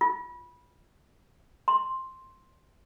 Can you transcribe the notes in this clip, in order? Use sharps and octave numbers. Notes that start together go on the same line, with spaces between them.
F4
C6